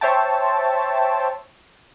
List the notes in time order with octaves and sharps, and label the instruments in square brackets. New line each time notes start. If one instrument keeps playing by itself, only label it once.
[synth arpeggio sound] C5 C#5 E5 G5 A5